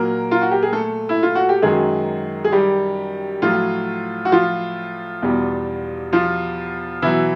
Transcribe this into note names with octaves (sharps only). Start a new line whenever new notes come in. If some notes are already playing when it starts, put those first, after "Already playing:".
Already playing: A#2 F#3 A#3 A#4
F4
F#4
G4
G#4
A3 A4
E4
F4
F#4
G4
F#2 D#3 F#3 G#3 G#4
G#4
G3 G4
A2 F3 F#3 F4
F#4
F3 F4
E2 B2 G3
F3 F4
B2 E3 F#3 E4